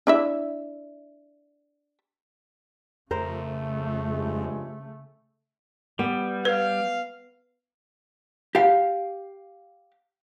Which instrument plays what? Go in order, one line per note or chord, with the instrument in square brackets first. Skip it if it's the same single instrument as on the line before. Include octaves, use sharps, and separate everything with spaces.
[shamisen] D4 E4 E5
[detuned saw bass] F2 [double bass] C#3 A3 [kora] A#4 C5
[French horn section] G2 F3 G#3
[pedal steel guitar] G3 [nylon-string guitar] B3
[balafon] B4 [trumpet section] F5
[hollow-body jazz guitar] G4 F5